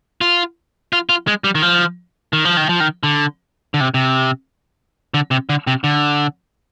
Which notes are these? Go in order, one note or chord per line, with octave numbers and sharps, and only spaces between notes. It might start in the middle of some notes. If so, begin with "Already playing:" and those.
F4
F4
F4
G#3
G3
D#3
F3
D#3
F3
D#3
F3
D#3
D3
D3
C3
C3
D3
C3
D3
C3
D3